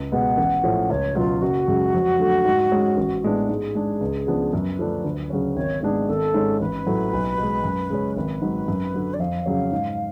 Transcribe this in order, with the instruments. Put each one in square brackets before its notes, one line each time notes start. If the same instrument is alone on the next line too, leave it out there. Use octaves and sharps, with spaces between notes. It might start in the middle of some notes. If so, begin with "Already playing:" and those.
Already playing: [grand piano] C#2
[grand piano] B2 G#3 B3 [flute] F#5
[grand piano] A1
A2 F3 A3 C#4
[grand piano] C#2 [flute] C#5
[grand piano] B2 F#3 C#4 [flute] F4
[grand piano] F#1 [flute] F#4
[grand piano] F#2 C#3 G#3
F2
D3 F#3 A3
G#2
G#3 C#4
A1
A2 G#3 B3 D4
[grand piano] G#2 [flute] G#4
[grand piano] G#3 D4
C#2
C#3 F3 B3 D4
[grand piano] F#2 [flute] B4
[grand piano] D3 F3 A3 D4
D2
C#3 F#3 C#4
[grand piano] G#1 [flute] C#5
[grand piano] G#2 G#3 B3 D4 [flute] G#4
[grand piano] G#1 [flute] A4
[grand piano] G#2 G#3 C#4
[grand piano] A1 [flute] B4
[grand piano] A2 F#3 A3
B1
B2 G#3
F#2
C#3 G#3 C#4
[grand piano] G#1 [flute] B4
[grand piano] G#2 F#3
F#2
D3 F#3
[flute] D5
[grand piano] F2 [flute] F5
[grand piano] C#3 F#3 C#4
G#2